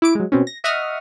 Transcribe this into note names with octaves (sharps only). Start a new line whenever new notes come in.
E4 D6 D7
F#3 G#3
B2 C4 C#4
A#6
D#5 E5 F#5 C#6 D#6 F6